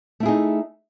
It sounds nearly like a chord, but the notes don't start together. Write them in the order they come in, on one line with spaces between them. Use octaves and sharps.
A3 E4 G#4 D#4